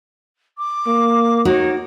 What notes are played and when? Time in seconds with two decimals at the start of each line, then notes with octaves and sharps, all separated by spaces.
0.57 D6
0.87 A#3
1.45 D#4 F#4 A#4 C#5